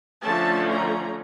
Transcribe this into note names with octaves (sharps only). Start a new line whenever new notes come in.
D3 F3 A3 C#4 A5
A#5